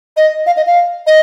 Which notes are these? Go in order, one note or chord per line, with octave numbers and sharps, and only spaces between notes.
D#5
F5
D#5
F5
D#5